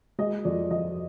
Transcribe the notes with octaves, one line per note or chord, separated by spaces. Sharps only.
G#3 D#5
F2 D5
F3 D#5